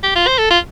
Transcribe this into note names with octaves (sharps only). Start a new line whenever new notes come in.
G4
F4
C5
A4
F4